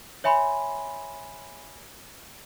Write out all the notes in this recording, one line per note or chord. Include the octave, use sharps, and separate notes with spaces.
C#5 E5 G#5 B5 C6